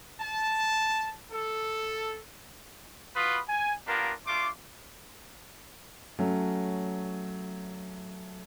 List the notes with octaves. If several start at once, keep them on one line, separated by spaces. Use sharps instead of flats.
A5
A4
F4 F#4 B4 B5 D#6
G#5
A#3 B3 D4 F4 G4 A#4
A3 D4 F4 C6 D6
F#3 A3 C#4